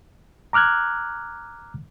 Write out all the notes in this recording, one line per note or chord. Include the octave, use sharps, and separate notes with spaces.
A#5 D6 F6 F#6 G#6